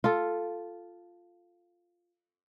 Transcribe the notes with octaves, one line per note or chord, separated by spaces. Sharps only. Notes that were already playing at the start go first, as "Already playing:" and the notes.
F4 A4